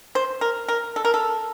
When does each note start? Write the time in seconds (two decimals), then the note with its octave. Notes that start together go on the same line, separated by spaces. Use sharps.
0.15 C5
0.41 A#4
0.68 A#4
0.96 A4
1.05 A#4
1.14 A4